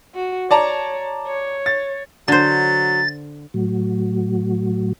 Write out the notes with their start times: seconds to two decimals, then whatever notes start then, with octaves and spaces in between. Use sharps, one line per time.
0.15 F#4
0.51 C#5 D5 A5 A#5
1.28 C#5
1.66 A6
2.28 D3 F#3 C5 A6
3.54 A2 F#3